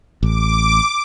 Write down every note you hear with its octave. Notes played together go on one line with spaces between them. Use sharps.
A1 D6